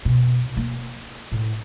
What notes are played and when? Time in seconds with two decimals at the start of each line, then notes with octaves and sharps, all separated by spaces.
0.05 B2
0.57 A#3
1.32 A2